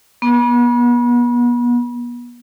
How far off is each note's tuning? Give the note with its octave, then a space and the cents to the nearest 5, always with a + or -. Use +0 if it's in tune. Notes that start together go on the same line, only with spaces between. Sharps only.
B3 -35